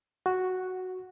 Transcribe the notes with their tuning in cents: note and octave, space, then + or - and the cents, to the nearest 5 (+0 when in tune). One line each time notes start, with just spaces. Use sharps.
F#4 +0